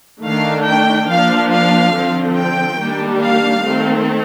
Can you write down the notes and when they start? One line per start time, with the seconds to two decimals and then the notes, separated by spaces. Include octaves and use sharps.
0.24 D#3 A3 D4 F5
0.66 G5
1.09 F3 A#3 D4 F5
1.52 F5
1.94 D3 F3 C4
2.37 G5
2.79 D#3 G3 A#3 D4
3.22 F5
3.64 D#3 A3 C4